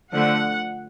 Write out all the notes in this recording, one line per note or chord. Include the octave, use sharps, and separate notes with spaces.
D3 F3 A3 F#5